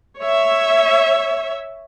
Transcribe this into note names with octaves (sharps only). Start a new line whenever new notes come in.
C#5 E5